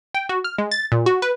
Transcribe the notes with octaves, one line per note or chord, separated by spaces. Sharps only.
G5
F#4
F6
G#3
A6
A#2
F#4
B4